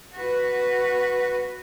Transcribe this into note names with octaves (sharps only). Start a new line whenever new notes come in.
F#4 B4